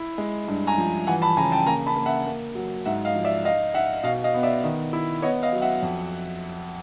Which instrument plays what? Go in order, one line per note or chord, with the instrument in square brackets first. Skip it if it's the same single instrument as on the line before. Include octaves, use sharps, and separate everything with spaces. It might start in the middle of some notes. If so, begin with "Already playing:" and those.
Already playing: [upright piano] E4
G#3
G2
G#5 A#5
F3
E3 F#5 G#5
A5 B5
C#3 G#5 A#5
G5 A5
A#3 G#5 A#5
A5 B5
A#3
E5 F#5
A#3
F#3
G#2 E5 F#5
D#5 F5
F3
D5 E5
D#4 D#5 F5
D#4 E5 F#5
B2 D#5 F5
D#5 F5
B3
D5 E5
D#3
E4
B3 C#5 D#5
D#5 F5
F#3
E5 F#5
F2